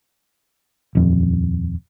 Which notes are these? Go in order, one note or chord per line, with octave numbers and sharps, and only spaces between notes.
D#1 F2